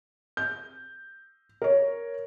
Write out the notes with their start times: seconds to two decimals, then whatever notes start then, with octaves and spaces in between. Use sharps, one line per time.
0.37 G6
1.62 A#4 C#5